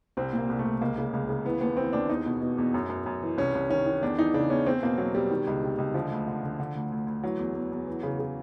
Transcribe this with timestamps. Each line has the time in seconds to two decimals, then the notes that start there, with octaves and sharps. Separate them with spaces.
0.17 C2 C4
0.33 A#2
0.38 A#3
0.49 C2
0.59 A3
0.65 C2
0.81 C#2 A#3
0.98 C#3
1.13 C#2
1.29 C#3
1.45 E3 B3
1.61 D#2 B3
1.77 E3 C4
1.93 D#2 D4
2.09 E2 D#4
2.26 B2
2.41 B2
2.58 E2
2.74 F#2
2.90 F#2
3.06 F#2
3.22 E3
3.37 C2 C#4
3.54 C2
3.69 D#3 C#4
3.86 D#3
4.03 E2 D4
4.18 E3 D#4
4.34 C#3 D4
4.50 E2 C#4
4.66 E2 C4
4.83 B2 A#3
4.98 E2 F#3
5.14 B2 G3
5.31 D#3
5.47 C#2
5.63 C3
5.78 C#2
5.94 D3 F3
6.11 D2
6.27 D3
6.43 D3
6.60 D3
6.75 D2
6.92 D2
7.07 D2
7.23 E3 F#3
7.39 E2
7.55 E2
7.72 E2
7.87 E3
8.03 C#3
8.19 C#3